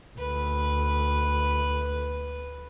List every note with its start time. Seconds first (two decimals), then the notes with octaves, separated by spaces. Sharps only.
0.18 D2 B4